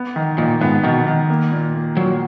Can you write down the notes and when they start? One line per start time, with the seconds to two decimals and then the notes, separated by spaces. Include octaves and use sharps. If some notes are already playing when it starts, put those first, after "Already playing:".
Already playing: B3
0.16 D#3
0.38 A#2 D#3
0.61 G#2 B3
0.83 B2 D#3
1.07 D#3
1.30 A#3
1.52 A#2
1.75 A#3
1.97 A#2 F#3